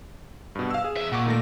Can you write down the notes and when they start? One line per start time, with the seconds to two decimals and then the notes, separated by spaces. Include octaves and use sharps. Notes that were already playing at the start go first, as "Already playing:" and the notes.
0.55 G2 B2
0.71 F5 E6
0.84 G#4
0.97 E2 E5
1.12 A#2 F#5 C#6 D6
1.26 D#3 A3 A#6